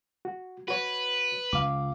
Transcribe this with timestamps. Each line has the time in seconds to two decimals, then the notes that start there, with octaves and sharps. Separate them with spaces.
0.25 F#4
0.68 F#4 B4 C#5
1.53 C#2 F5 D6